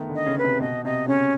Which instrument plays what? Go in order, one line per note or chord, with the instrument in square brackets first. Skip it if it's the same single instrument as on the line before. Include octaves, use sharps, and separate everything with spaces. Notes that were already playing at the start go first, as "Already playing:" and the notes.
Already playing: [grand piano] D#3 A3 B3
D3
[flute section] D#5
[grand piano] C#3
[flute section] B4
[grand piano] C3
[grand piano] B2 [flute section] D#5
[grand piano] C3 [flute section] D#5
[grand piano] C#3 [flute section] C#4